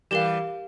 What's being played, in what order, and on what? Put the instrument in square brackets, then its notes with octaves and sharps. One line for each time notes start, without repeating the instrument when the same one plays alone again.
[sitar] E3 G3 [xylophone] G4 A#4 F5